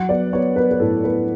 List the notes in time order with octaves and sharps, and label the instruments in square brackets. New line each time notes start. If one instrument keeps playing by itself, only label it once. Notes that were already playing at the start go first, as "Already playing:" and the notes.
Already playing: [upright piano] F#3 F#5
B3 D5
B3 C#5
B3 B4
B4
A2 A4
B3 B4